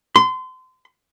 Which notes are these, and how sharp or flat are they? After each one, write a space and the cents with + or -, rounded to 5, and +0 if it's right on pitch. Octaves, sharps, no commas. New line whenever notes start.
C6 -30